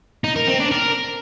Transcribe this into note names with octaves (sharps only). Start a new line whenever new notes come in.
D#4
A#4
C4
D4
A#4